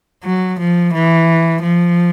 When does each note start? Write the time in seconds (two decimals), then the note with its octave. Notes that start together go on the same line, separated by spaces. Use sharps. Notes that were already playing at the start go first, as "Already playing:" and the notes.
0.24 F#3
0.59 F3
0.94 E3
1.62 F3